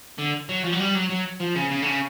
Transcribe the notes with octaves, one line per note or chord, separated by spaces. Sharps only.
D3
F#3
F3
F#3
G3
F#3
F#3
F3
C#3
C#3
D3
C#3